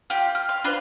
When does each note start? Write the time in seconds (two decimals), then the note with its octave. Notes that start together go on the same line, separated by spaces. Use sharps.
0.10 F4 G4
0.35 F6
0.49 F5 C6
0.64 D4 F4 B4 C5